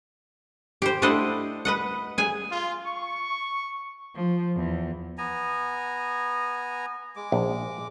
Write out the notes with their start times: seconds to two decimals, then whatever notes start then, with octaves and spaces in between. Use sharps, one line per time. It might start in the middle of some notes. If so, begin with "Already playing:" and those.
0.82 G4 C5
1.02 A3 D4 E4 C5 D#5 F#5
1.65 B4 D#5 F#5
2.18 G#4 G#5
2.51 F4
2.85 C#6
4.15 F3
4.56 E2
5.18 B3 G#5 A#5
7.16 G#3 D6
7.32 A#1